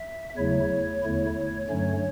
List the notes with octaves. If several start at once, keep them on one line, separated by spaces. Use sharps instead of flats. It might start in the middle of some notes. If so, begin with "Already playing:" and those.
Already playing: E5
E2 C#3 F#3 A3 E4 C#5
E2 D3 A3 E4
G2 D3 F#3 A3 C#4 C#5